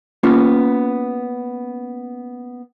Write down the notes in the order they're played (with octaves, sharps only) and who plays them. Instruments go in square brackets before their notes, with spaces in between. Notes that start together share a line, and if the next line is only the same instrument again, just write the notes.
[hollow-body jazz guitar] A#3 B3 C#4 F4